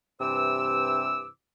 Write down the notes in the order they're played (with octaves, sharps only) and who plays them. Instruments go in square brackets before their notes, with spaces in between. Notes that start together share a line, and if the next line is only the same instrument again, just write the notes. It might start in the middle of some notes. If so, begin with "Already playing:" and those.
[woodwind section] G2 C3 E3 C5 D6 E6